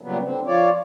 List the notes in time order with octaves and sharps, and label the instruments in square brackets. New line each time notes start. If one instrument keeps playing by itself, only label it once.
[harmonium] A#2 C#3 F#3 G3 B3
D3 C4
F3 F4 C#5 D5